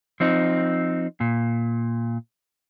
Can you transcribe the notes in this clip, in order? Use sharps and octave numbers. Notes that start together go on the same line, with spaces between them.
F3 C4 D#4
A#2